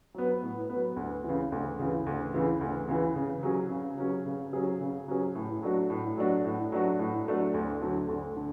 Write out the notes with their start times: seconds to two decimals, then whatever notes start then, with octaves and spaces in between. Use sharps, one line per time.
0.15 F#3 B3
0.43 A2
0.70 F#3 B3
0.96 D2
1.24 C#3 E3
1.52 D2
1.79 C#3 E3
2.06 D2
2.34 C#3 E3
2.61 D2
2.88 C#3 E3
3.16 C#3
3.43 F#3 C#4 G#4
3.71 C#3
3.98 F#3 C#4 G#4
4.26 C#3
4.53 F#3 C#4 G#4
4.81 C#3
5.08 F#3 C#4 G#4
5.35 A2
5.62 F#3 A3 D4 F#4
5.90 A2
6.17 F#3 A3 D4 F#4
6.45 A2
6.72 F#3 A3 D4 F#4
6.99 A2
7.26 F#3 A3 D4 F#4
7.54 D2
7.81 D3 F#3 A3
8.09 D2
8.36 D3